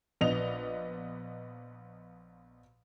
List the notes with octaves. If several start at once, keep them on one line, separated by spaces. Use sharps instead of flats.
A#1 B3 D#5 F7